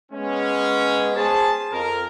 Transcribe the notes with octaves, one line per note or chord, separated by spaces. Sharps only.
G#3 B3 C#4
G#4 C5 A5
F2 A#4